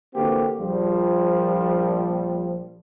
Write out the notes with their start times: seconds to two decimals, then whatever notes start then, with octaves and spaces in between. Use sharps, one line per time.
0.14 D3 E3 A#3 C4 F#4 G4
0.58 A#1 F3 G3